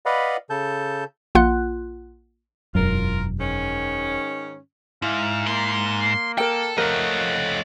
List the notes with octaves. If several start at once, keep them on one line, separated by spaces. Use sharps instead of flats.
B4 D5 D#5 F5 F#5 B5
C#3 A4 A5 G6
A#1 A#3 F4 F#5 C6 F#6
E1 F#2 F4 A#4
G#2 D#3 C#4
G#2 E4 F5
A#3 C6
A4 A#4 G5
F3 A3 A#4 C#5 D#5 F#5